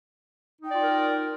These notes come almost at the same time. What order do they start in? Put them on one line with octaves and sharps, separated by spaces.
D#4 G5 D5 F4 A#4